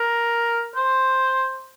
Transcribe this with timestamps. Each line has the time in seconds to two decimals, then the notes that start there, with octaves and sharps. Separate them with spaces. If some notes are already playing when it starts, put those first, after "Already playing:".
Already playing: A#4
0.76 C5